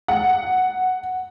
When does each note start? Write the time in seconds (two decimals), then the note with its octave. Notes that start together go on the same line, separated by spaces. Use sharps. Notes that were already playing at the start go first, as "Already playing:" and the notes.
0.08 F#5